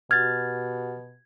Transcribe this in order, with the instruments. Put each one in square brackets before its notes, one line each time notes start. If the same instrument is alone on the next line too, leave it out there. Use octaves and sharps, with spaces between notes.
[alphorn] B2 [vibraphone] F#4 G4 F#5 [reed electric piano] F6 A6 [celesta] G#6